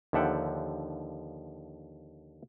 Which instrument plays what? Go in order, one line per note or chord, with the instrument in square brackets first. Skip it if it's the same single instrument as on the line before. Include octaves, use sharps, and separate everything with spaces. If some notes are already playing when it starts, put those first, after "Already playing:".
[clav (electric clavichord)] D#2 D3 F3 E5 F#5 G5